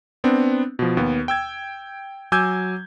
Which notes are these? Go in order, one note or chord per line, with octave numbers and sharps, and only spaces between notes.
B3 C4 D4
B2 F3
D#2 B3
G5 E6 G#6
F#3 G#5 D6 E6 G6 G#6